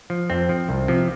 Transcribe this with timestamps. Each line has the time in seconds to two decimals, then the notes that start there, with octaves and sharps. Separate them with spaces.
0.10 F3
0.30 F2 C4
0.49 F3
0.69 C2
0.88 C3 F3